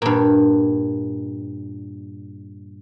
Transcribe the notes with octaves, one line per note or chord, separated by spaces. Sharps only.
G2 A#2